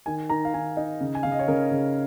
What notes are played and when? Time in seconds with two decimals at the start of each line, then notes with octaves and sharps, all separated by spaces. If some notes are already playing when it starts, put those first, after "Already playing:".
0.06 D#3 G#5
0.30 D#3 A#5
0.45 F5
0.54 D#3 G#5
0.77 D#4
1.01 C#3
1.15 G#5
1.23 C#3 F5
1.32 D#5
1.39 C#5
1.48 C#3 A#4
1.71 C#3